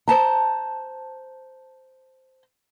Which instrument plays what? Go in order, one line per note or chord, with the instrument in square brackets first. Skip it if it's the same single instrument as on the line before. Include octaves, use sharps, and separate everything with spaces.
[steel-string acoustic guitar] C5 A5 A#5